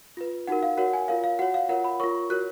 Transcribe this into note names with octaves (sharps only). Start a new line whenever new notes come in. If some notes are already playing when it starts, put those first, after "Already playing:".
F4 B4
D#4 F#4 A#4 F#5
F5
F#4 A#4 C#5 F#5
G#5
F4 A#4 C#5 F5
F5
F#4 C#5 F#5
F5
F4 A#4 C#5 F#5
B5
F4 A#4 C#5 C#6
F#4 A#4 C#5 F#6